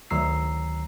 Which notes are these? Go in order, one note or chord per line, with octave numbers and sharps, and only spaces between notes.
D2 D#3 F#3 A#5 E6 C7